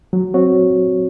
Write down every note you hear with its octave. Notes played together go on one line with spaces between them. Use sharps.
F#3
C4 F#4 C#5